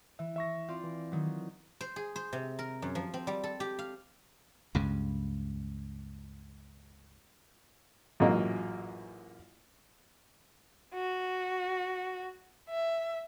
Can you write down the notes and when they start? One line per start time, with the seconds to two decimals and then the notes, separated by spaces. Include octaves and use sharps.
0.19 E3 E5
0.36 E5 C#6 A#6
0.68 C4 F4 D5
0.84 E3
1.12 D#3 F#3
1.81 C5
1.96 G#4
2.16 C5
2.33 C3
2.59 A#4
2.82 F#2
2.95 F3
3.14 C4
3.27 G3
3.44 A4
3.60 G4
3.79 F5
4.75 C#2 G2 C#3
8.20 A1 F#2 A#2 G#3 A#3 D#5
10.94 F#4
12.70 E5